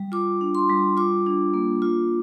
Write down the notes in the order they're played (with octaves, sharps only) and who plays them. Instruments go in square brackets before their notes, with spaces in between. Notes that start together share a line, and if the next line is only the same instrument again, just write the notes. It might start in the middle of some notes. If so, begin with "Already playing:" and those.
Already playing: [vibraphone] G3
F4 D6
D4
C6
G3
F4 D6
D4
A#3
F4